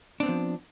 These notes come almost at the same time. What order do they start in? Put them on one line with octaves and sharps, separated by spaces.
D4 C4 B3 F3